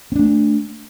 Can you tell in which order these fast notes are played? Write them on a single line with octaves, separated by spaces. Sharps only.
C4 D4 A3